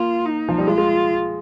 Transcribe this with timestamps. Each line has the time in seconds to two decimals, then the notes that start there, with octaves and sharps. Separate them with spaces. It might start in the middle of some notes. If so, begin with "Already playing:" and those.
Already playing: A#3 F4
0.25 D#4
0.49 F3
0.58 G3
0.67 G#3 F4
0.78 G#3